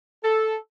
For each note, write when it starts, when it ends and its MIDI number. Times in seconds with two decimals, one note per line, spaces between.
0.24 0.56 69